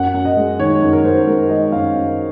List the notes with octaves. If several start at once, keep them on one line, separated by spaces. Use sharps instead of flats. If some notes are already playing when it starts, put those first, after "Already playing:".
Already playing: F#2 F#5
F#2
D#5
G#3
D#3 C#5
F#2
A#4
F#2 C5
G#3 A#4
D#3 D#5
F#2 F5
F#2